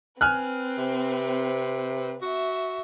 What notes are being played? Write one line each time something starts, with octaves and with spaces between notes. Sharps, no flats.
C4 B4 G#5 F6 F#6
C3
F#4 E5